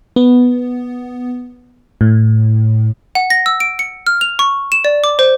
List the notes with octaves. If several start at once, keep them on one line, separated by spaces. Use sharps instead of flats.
B3
A2
F#5
A#6
E6
D7
C#7
F6
F7
C#6
E7
D5
D6
C5